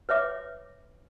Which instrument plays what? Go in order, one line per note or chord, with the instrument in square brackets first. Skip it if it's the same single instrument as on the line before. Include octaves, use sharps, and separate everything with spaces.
[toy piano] B4 C#5 E5 D6